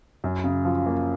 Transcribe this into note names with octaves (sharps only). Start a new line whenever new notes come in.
F#2
C#3
F3
A#3